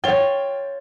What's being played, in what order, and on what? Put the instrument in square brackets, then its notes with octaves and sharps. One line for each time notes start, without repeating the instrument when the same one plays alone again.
[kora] F4 C#5 [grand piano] G5 A6 G7